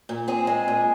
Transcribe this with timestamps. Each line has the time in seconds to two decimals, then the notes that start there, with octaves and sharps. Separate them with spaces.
0.09 A#2
0.28 C4 G#4
0.47 G#3
0.68 A#2